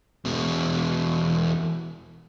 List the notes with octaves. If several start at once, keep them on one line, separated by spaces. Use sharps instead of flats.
E2 B2